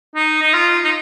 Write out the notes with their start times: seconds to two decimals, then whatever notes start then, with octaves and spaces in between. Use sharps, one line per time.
0.16 D#4
0.42 D#4
0.53 F4
0.85 D#4